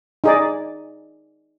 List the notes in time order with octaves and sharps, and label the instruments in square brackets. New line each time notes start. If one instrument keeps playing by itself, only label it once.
[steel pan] D#4 G#4 D5